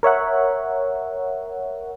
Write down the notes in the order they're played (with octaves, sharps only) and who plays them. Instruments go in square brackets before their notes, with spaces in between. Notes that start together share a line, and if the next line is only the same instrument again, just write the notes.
[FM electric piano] A#4 C#5 E5 F#5